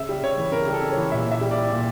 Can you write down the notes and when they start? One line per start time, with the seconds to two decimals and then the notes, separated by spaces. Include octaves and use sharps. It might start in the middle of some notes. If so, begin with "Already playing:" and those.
Already playing: C#3 E5
0.09 G3
0.23 C#3 C#5
0.38 E3
0.52 C#3 A#4
0.67 G3
0.73 A4
0.82 C#3
0.92 E3 C#5
1.11 A#2 E5
1.27 A#2 E5
1.41 G3
1.51 G3 D5
1.70 A#2